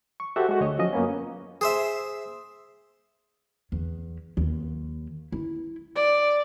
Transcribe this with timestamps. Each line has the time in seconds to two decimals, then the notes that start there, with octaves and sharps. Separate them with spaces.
0.20 C#6
0.36 F#4 G4 A4 C5 E5 F#5
0.49 G#3 F#4
0.61 D2 A3 C#5 D#5
0.79 F3 F#3 C#4 D#5
0.93 F#2 A#3 B3 C#4
1.61 G#4 C5 E5
3.72 E2
4.37 D#2
5.32 E4
5.96 D5